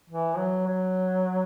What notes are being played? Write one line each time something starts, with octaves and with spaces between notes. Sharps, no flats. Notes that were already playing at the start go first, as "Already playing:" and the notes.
E3
F#3
F#3